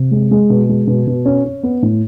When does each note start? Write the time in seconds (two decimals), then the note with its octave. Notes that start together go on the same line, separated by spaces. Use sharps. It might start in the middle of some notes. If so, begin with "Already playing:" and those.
Already playing: C3
0.11 G#3
0.31 G#3
0.50 B2
0.69 G#3
0.87 B2
1.07 B2
1.25 C#4
1.45 C#4
1.63 B3
1.82 A2